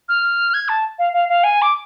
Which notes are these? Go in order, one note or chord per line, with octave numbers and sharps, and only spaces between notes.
F6
G#6
A5
F5
F5
F5
G#5
D6